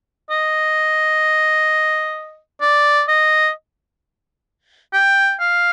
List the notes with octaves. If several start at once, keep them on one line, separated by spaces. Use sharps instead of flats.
D#5
D5
D#5
G5
F5